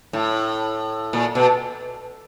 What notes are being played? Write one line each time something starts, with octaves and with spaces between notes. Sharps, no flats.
A2
A#2
B2